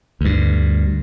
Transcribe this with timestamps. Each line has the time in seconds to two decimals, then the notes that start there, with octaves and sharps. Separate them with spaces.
0.21 D2 G2